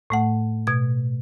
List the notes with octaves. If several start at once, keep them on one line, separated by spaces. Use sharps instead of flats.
A2 A3 F#5
B2 G#6